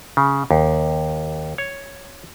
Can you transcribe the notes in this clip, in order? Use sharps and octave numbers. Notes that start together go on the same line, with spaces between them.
C#3
D#2
C#5